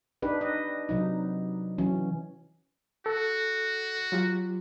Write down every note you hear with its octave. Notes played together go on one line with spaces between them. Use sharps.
D4 D#4 G4 B4
D#5
C3 F#3 D#4
E3 F#3 C#4
F#4 A4
F#3 F4 G4